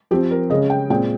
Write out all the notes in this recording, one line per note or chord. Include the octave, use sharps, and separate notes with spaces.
F3 C4 G4
A#4
C#3 G#3 C#4 D#5
G5
A#2 G#3 C4 G5